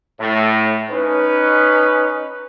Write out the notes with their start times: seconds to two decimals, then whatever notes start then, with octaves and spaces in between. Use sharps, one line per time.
0.19 A2
0.90 C#4 D#4 B4